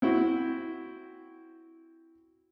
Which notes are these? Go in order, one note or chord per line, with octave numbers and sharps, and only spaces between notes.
C4 E4 F#4